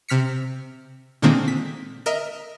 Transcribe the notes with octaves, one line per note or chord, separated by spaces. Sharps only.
C3 F6 B6 C#7
A#2 D3 D#3 G#3 A#3 C4
B6
A#4 D#5 E5